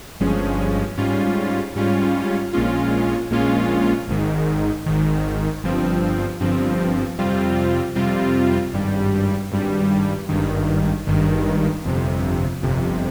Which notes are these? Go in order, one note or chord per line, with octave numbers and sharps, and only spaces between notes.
G1 G2 F3 G#3 C#4
G#2 G3 C#4 F4
G#2 G3 C#4 F4
A#1 A#2 G#3 C#4 F4
A#1 A#2 G#3 C#4 F4
G#1 G#2 D#3
G#1 G#2 D#3
G1 G2 F3 C4
G1 G2 F3 C4
F2 C3 G3 C4 F4
F2 C3 G3 C4 F4
G#1 G2 G3
G#1 G2 G3
G#1 G2 D#3
G#1 G2 D#3
G1 F2 C3
G1 F2 C3